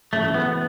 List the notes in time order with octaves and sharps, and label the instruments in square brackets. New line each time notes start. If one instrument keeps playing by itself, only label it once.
[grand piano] F#2 C#3 E3 [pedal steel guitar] A3
[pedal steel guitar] B3